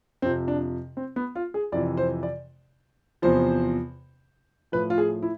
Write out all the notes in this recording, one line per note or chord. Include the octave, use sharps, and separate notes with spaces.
F2 C3 F3 C4
D4
C4
B3
F4
G#4
F2 C3 E3 D5
C5
D5
E2 C3 F3 C5
A2 F3 B4
F4
G#4
E4